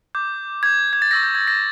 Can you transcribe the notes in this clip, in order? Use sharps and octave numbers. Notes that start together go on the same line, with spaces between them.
D6 G6
D6 G6 G#6
G#6
A6
C#6 E6 G6 A#6
G6
G#6
A#6